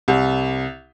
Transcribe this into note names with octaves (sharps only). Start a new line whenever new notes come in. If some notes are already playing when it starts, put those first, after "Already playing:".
C2